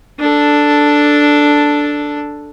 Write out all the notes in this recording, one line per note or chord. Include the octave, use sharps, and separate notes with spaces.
D4 A4